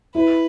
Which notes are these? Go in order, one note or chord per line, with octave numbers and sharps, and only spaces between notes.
E4 B4